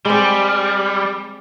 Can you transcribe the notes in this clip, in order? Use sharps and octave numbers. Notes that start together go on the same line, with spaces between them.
G3 G#3 C4